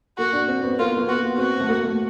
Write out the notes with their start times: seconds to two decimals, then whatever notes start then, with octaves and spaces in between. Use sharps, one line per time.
0.18 A#3 F#4
0.33 D4
0.48 C4
0.63 B3
0.79 A#3 F4
0.96 A#3
1.08 B3 F#4
1.38 C4 F#4
1.60 A3
1.69 A#3
1.83 A3